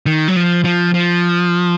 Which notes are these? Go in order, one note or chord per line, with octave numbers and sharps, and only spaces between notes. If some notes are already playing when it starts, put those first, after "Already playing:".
D#3
F#3
F3
F3
F3